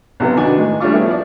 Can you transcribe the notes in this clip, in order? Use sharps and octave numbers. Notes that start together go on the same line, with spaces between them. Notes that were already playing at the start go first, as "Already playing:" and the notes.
B1 C3 F#3 B3
D#3 D4 F#4 B4 G#5
A2 G#3
G3 A3 C#4 D4 F4 C#6
A3 B3 E4 G4 G#4
F3 D5